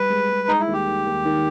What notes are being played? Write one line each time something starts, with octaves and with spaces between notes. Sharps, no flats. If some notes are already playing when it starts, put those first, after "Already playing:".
Already playing: G3 B4
G#3
G#3
G#3 D#4
E4
D#2
G4
D#3
D#2
D#3